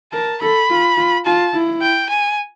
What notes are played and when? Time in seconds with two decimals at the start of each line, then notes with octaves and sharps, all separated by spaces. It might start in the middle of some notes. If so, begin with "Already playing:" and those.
0.13 A#4 A5
0.41 A4 B5
0.70 F4
0.98 F4
1.26 F4 A5
1.54 E4
1.82 G5
2.10 G#5